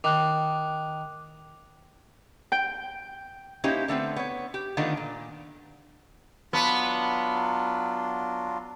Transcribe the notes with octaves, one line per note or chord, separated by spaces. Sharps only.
D#3 D6 F#6
G5
A#3 C#4 D#4 E4 G4 C5
D3 A3 B3 C4
B3 C#5
G4
D3 D#3 A3 B3 D4 F4
A#2
F#3 B3 D4 F4